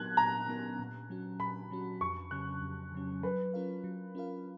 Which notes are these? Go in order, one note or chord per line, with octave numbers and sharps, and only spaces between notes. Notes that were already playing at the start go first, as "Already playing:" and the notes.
Already playing: A#2 F#3 B3 D#4 A#4 F#6 G#6
A#2 A#5
F#3 B3 D#4 A#4
A#2
F#3 C#4 F#4
A#2 B5
F#3 C#4 F#4
F2 C#6
C#3 F#3 C#4 F#6
F2
C#3 F#3 C#4
F#3 B4
C#4 F4 A#4 F5
F#3
C#4 F4 A#4 F5